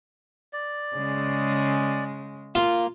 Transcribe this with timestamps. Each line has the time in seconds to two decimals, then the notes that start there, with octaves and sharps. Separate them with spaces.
0.53 D5
0.96 C#3 G#3
2.55 A#3 F4